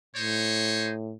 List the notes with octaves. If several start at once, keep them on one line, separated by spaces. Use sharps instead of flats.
A2 D#4 C5 C#5